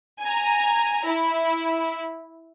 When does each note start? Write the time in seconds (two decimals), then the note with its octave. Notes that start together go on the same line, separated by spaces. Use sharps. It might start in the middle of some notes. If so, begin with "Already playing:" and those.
0.21 G#5 A#5
1.07 E4